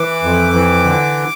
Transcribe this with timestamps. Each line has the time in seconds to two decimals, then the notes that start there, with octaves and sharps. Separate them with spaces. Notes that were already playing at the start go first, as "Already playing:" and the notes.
Already playing: E3 D6
0.23 F2
0.54 E3
0.84 D3